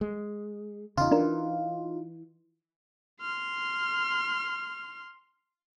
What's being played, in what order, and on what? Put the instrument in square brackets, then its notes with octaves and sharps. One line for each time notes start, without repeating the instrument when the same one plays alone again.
[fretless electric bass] G#3
[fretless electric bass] E2 C#3 [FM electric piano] D#4 F4
[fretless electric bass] E3 [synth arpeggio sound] D4 A#4
[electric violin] C6 F6